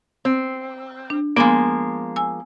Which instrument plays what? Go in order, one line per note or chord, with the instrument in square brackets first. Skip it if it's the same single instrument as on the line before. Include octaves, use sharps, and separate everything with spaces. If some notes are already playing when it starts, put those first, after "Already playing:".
[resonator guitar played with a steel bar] C4
[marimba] D4
[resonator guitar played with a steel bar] F3 G#3 A#3 [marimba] B3
[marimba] G#5 E6